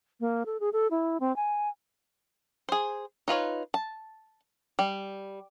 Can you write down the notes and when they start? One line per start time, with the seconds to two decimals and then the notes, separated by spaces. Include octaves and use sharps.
0.20 A#3
0.46 A4
0.60 G#4
0.73 A4
0.91 E4
1.20 C4
1.36 G#5
2.69 G#4 C5
3.28 D#4 F4 B4 C#5
3.74 A5
4.79 G3